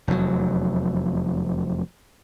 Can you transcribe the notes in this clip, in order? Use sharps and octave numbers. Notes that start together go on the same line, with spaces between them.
F1 E2 A#2 F#3